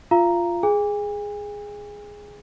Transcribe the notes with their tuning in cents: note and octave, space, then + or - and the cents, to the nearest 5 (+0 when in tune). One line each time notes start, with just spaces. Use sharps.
F4 -5 F5 -30 A#5 +0
G#4 +0 G#5 -45